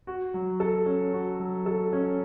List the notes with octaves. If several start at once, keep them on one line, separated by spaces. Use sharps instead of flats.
F#4
F#3
A4
C#4
F#4
F#3
A4
C#4